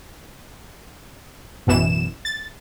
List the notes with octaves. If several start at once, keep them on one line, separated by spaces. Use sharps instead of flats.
A1 F#2 B2 E3 E7
A6